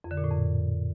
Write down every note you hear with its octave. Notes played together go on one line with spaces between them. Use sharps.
F2
D3
A#2
A2
F2